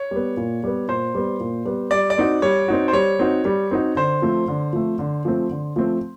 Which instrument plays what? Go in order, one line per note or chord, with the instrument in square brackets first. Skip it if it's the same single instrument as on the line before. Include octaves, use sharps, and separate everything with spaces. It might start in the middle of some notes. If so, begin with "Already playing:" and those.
Already playing: [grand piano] C#5
[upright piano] G3 B3
A#2
G3 B3
[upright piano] A#2 [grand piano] C5
[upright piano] G3 B3
A#2
G3 B3
[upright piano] G3 [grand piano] D5
[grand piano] D5
[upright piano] C4 D#4 F#4
[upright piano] G3 [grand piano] C#5
[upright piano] C4 D#4 F#4
[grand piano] C5
[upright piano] G3 [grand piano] C#5
[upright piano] C4 D#4 F#4
G3
C4 D#4 F#4
[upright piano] D3 [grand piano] C5
[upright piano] F3 A3 C4
D3
F3 A3 C4
D3
F3 A3 C4
D3
F3 A3 C4